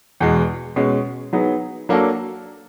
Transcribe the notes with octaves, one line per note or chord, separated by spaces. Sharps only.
E2 B2 G#3
B2 G#3 C#4
F#3 B3 D#4 G#4
F#3 A#3 D4 F#4 A4